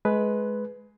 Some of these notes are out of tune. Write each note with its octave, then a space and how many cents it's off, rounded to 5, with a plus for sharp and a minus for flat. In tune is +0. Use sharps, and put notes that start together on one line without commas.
G#3 +25 B4 +5